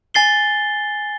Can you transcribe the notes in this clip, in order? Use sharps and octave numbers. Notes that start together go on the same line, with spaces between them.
G#5 A6 C7 G7